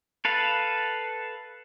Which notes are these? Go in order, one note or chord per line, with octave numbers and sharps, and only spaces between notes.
A4 B4 F5